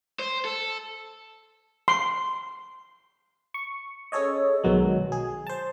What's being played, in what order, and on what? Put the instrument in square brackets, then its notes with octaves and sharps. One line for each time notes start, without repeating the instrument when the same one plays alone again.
[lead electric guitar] C5
A4
[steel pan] C6
[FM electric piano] C#6
C#4 G#4 A4 C#5 D#5
B1 B2 D#3 F#3 G#3
G#4
C5 A5